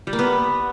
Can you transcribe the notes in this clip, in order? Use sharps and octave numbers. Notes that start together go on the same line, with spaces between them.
G3
A#3
B3